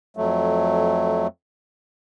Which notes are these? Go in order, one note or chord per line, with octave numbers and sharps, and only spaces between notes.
F2 F#3 A3